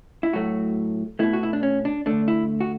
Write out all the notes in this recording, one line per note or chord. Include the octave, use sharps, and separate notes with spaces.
E4
A2 F#3 A3 F#4
B2 A3 E4
F#4
E4
D4
C#4
D4
D3 A3 D4
E4
F#4